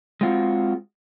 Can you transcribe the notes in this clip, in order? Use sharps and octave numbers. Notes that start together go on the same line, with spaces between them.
G#3 C4 F4 F#4